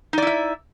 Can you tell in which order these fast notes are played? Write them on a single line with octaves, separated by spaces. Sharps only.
D#4 D5 E4 E5